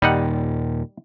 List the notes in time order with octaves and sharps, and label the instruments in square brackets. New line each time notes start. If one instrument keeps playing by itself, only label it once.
[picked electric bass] D#2 A#2 D#3 [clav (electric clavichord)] G3 D#4 F#5